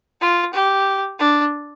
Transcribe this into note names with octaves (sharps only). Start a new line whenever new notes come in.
F4
G4
D4